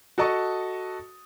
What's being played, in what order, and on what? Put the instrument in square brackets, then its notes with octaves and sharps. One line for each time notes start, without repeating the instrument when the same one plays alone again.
[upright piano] F#4 A4 D#5 A5 C#6 D#6